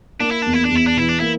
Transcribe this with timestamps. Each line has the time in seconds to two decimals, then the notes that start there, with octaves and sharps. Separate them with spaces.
0.20 A#3 D4
0.31 E4
0.42 E2 D4
0.53 E4
0.65 D4
0.71 E2 E4
0.87 D4
0.97 E3 E4
1.09 D4
1.20 A#3 E4